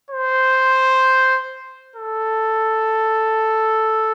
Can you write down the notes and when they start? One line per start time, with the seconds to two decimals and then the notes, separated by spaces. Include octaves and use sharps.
0.11 C5
1.96 A4